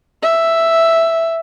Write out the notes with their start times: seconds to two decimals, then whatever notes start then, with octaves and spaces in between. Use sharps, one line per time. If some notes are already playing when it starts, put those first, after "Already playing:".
0.23 E5